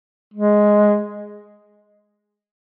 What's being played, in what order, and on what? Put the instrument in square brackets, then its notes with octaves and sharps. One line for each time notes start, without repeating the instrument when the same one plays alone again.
[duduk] G#3